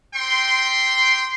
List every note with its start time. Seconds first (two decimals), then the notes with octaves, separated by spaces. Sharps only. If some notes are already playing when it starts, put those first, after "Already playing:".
0.15 C4 G4 G5 C6